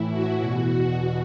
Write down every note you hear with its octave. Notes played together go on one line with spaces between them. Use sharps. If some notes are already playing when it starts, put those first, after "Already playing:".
Already playing: A2 E3 E4
F#4
E2 B2
F#4